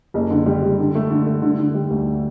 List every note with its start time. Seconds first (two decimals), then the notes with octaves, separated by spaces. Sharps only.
0.14 F#1
0.31 D3
0.46 G3
0.63 G3
0.79 D3
0.95 A3
1.10 D3
1.26 A3
1.42 D3
1.59 D3
1.74 G3
1.91 D2